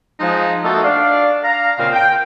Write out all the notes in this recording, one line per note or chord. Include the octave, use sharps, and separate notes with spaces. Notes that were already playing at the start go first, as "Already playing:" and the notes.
F3 G#3 D#4
A3 A#3 D#4 F#4 A4
D4 D5 F5
F5 A#5
A#2 C#3 C4 F5
G5